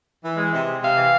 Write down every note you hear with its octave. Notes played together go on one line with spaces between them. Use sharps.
E3
G#3
C3
G#3
C3 F5
E3